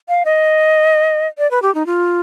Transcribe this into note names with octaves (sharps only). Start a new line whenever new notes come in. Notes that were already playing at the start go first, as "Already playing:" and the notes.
F5
D#5
D5
B4
G4
D#4
F4